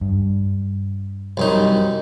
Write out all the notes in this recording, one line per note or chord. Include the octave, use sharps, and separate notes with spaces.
G2
C2 F#2 D#4